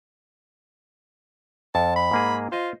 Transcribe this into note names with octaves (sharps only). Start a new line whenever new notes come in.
F2 A5
B5
G#2 A#3 G#4
F4 C5 D#5